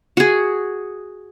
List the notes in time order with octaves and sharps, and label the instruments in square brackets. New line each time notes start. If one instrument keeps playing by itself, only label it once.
[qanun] F#4 G#4